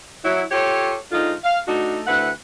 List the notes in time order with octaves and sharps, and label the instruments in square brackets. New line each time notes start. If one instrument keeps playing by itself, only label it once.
[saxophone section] F#3 E4
F4 G4 A4 C#5
G#2 D3 D#4 F4
F5
A3 D4 D#4 F#4
D2 E4 B4 F#5